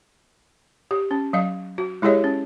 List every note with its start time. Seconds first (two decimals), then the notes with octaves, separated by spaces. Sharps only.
0.91 G4
1.11 C#4
1.33 F#3 D#5 F5
1.78 F#4
2.02 G#3 E4 G4 G#4 C#5 D#5
2.24 C#4